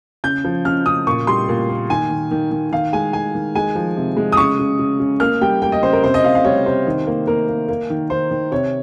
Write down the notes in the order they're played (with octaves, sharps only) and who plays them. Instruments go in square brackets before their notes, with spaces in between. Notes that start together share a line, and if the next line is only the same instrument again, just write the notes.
[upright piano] C#3 G6
F3
C#3 F6
C#3 D#6
A#2 C#6
G3 C6
A#2
A#3
D#3 G#5
D#3
D#3
D#3
D#3 F5
G#3 G#5
D#3 G#5
D#3
G#3 G#5
F3
C3
G#3
D#6
C#3 C#6
C#3
C#3
C#3
A#3 F6
G3 G5
A#3 G5
D#5
C#3 C5
A#4
C3 C5
D#5
C3 F5
F5
G3 C#5
C3 C5
D#3
A#3
A#3 A#4
A#3
A#3
D#3
D#3 C5
D#3
C3 C#5